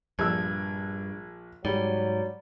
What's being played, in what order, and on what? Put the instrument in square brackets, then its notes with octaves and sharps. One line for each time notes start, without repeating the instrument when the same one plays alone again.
[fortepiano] A#1 E6 [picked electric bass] G2 [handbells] G#6
[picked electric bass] G#2 [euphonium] F#3 [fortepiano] G3 [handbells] D5